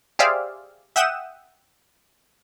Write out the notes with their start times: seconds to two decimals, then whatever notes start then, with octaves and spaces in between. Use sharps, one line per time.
0.19 G4 G#4 C5 D5 E5 F5
0.96 E5 F#5 G5 D#6 E7